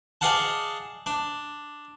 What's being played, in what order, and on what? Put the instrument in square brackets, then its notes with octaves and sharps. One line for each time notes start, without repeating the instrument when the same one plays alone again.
[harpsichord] G#4 D5 D#5 F5 F#5 A5
D4